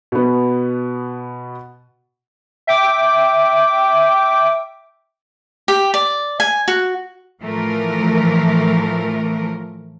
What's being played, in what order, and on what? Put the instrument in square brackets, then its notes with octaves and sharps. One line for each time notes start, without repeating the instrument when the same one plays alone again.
[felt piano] B2 B3
[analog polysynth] E5 G5 D6
[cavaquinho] G4
D5
G#5
F#4
[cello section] A2 E3 F3 A3 A#4